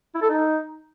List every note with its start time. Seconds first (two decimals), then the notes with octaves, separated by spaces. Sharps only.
0.15 E4
0.22 A4
0.29 D#4